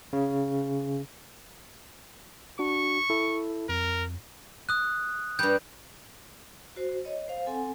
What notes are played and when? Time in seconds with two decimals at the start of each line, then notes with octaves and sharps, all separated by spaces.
0.13 C#3
2.59 D4 F#4 C#6
3.10 E4 A4
3.69 F2 A#4
4.69 D#6 F#6
5.39 G2 G3 G6
6.76 F#4 C5
7.05 C#5 D#5
7.28 C5 F5
7.46 C4 A4 F#5 G#5